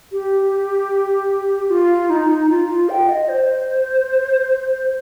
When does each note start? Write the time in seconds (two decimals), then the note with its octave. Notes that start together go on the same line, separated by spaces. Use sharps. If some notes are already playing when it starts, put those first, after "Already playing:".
0.12 G4
1.70 F4
2.10 D#4
2.50 F4
2.69 F4
2.89 G5
3.08 D#5
3.29 C5